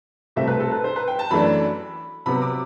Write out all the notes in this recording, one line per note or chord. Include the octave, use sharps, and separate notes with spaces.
C2 B2 A3 C4 E5
B4
A4
B4
C5
B4
G5
A5
F#2 E3 A3 D4 B5
C3 F#3 B3 B5
D6